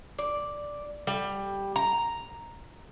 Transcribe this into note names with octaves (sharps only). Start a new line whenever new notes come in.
D5
G3
A#5